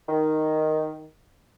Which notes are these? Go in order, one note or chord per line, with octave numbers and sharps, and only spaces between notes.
D#3